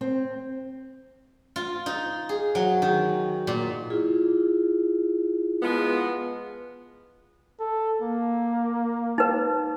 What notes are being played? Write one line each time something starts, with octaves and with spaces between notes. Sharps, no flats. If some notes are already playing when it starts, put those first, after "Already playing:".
C4
F4
D#4
G#4
F#3
D#3
A#2
E4 F4 G#4
F3 G#3 B3
A4
A#3
D#4 B4